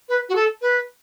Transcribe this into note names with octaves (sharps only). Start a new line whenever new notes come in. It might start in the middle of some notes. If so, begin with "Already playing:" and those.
B4
F#4
A4
B4